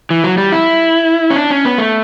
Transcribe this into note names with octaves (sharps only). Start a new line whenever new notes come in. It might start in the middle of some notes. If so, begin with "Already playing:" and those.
E3
F#3
G3
E4
C#4
D4
C#4
B3
A3